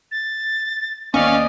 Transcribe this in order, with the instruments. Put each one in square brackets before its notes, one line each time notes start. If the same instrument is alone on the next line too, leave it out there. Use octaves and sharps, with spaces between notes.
[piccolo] A6
[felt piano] D#2 B3 [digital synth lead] C#4 [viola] D5 D#5 [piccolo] F5